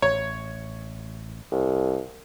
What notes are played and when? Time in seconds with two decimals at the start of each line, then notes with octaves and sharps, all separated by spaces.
0.02 A1 C#5
1.52 C2